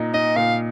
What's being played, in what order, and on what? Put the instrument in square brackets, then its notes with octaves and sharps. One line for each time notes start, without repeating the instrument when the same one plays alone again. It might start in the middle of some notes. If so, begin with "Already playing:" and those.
Already playing: [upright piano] A#2 D#4
[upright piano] D#4 [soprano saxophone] D#5
[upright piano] A#2 [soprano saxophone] F5